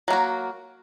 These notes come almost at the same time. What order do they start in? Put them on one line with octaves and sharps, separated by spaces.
F#3 A#3 F#4